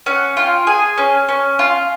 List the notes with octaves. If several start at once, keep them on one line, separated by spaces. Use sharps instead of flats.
C#4 F#5
F4 G5
G#4 G#5
C#4
C#4
F4